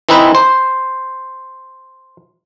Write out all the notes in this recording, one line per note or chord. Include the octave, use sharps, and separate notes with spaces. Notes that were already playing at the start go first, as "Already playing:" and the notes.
E3 C4 D#4 E4 B4
C5